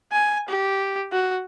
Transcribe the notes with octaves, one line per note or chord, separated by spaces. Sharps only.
G#5
G4
F#4